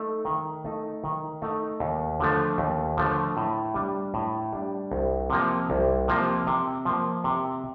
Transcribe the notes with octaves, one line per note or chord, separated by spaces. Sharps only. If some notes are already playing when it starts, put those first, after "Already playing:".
Already playing: A3 D#4 A4
D#3
A3 D#4
D#3
A3 D#4
D#2
D3 F3 A3
D#2
D3 F3 A3
A2
G3 D4
A2
G3 D4
C2
C3 F3 A#3
C2
C3 F3 A#3
C3
F3 A#3
C3